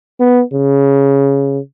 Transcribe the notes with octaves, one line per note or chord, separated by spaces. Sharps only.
B3
C#3